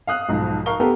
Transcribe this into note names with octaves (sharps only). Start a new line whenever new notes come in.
F5 D#6 F#6
B1 G#2 F3
A#4 F5 C#6 G7
B3 G4 A4 A#4